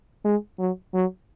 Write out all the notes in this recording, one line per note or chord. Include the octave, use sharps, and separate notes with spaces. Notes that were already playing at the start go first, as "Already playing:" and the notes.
G#3
F#3
F#3